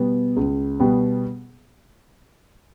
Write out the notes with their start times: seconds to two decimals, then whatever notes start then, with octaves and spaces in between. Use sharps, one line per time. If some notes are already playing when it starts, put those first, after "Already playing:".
Already playing: B2 G3 B3
0.37 C#2
0.80 B2 G3 B3